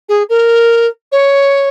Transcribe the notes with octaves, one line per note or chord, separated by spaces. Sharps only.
G#4
A#4
C#5